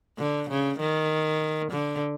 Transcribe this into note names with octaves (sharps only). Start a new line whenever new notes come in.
D3
C#3
D#3
D3